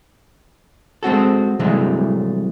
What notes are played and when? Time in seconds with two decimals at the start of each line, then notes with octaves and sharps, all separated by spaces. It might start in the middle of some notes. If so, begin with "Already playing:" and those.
1.03 G#3 C4 F#4 A4
1.59 C2 C3 E3 F#3 G#3 A3